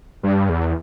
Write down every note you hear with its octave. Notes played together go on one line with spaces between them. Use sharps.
G2
E2